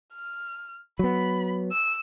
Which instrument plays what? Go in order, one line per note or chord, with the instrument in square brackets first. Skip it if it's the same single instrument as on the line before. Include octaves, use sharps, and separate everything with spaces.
[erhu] F6
[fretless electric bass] F#3 B3 [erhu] B5
[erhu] E6